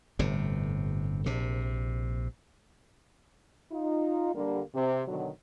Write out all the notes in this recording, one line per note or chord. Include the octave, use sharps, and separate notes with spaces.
G1 A2 C3
A#1 C3
D#4 F4
D3 G3 A#3
C3
B2 D3 D#3 F#3